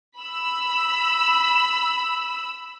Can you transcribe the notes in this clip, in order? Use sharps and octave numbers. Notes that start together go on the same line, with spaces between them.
B5 E6